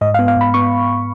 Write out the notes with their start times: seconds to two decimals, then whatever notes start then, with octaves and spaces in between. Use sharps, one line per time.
0.01 G#2 D#5
0.14 F5
0.19 B3
0.28 F5
0.36 G#2 B5
0.54 B3 C#6